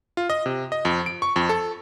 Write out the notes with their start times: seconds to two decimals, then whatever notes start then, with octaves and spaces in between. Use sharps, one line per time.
0.17 F4
0.30 D#5
0.46 C3
0.72 D#5
0.85 F2
1.06 D7
1.22 C#6
1.36 F2
1.49 A4